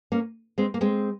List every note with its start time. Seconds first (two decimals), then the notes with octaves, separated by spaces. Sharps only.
0.12 A#3 C#4
0.58 G#3 C4
0.74 A#3
0.81 G#3 C4